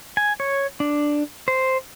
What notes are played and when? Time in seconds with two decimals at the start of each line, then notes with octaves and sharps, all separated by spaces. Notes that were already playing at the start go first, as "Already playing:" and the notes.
0.17 G#5
0.40 C#5
0.80 D4
1.48 C5